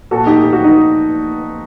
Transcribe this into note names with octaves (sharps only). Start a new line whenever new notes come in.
A#2 F#4 A4
D#4 G4
G4
F#4
D#4